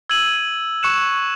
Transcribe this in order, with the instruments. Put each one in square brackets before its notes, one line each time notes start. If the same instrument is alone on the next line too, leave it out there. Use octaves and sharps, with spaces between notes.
[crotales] E6 G#6 D#7 F#7
C#6 F#6 C#7 E7